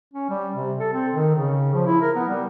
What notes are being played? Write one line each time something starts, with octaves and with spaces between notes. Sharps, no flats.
C#4
G3
C3
A4
C4
D#3
C#3
F3
E4
A#4
B3
G3